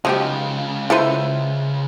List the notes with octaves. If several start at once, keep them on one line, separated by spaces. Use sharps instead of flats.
C#2 C#3 F3 F#3 D#4 G4
E4 F4 A4 B4 C5